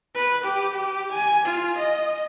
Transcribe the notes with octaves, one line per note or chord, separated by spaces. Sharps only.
B4
G4
G4
G#5
F4
D#5